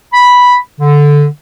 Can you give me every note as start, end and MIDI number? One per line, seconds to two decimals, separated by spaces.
0.13 0.56 83
0.80 1.24 50